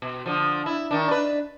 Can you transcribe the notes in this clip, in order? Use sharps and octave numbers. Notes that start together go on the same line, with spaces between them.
B2
D3 F3
E4
D#3 D4
D4 B4